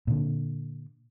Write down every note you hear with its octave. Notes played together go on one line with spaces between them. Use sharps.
A#2 D3